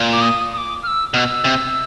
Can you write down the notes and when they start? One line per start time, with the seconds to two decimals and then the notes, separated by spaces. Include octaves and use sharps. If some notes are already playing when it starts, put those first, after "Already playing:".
Already playing: A#2
0.13 D6
0.21 D#6
0.53 D#6
0.57 D6
0.83 F6
0.87 E6
1.14 B2 F6
1.19 E6
1.44 C3